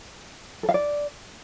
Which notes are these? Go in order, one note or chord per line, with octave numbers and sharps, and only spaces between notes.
A4
F5
D5